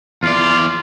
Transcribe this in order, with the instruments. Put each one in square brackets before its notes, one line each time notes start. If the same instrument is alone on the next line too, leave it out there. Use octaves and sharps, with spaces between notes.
[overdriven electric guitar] E2 D5 [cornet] F4